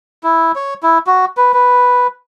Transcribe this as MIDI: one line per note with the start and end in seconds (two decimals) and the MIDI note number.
0.23 0.52 64
0.56 0.74 73
0.83 0.98 64
1.07 1.25 66
1.37 1.52 71
1.53 2.07 71